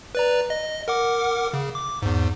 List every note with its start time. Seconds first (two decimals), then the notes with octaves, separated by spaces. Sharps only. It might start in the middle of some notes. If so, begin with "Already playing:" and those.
0.15 B4 D5 A#5
0.50 D#5
0.88 A#4 F#5 D6
1.54 C#3
1.75 D6
2.02 E2 G#2